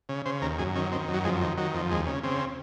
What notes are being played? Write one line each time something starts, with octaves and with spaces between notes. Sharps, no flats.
C#3
C#3 C5
D#2 A#4
F#2 G#4
D#3 C#4
D#3 C4
F#2
F#3
F2 G#3
D#3
D#3 F#3
F2
D#2 G#3
C#3
C#3 C4